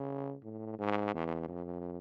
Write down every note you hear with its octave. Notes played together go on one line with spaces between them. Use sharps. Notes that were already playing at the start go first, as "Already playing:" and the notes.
Already playing: C#3
A2
G#2
E2
F2